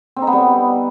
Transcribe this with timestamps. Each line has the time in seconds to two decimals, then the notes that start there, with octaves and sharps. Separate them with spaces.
0.16 C4
0.22 D#4
0.27 B3
0.33 G3